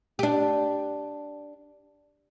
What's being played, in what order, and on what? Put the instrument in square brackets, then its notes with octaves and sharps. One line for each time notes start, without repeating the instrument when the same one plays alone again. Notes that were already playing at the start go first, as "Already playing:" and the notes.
[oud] D4 G4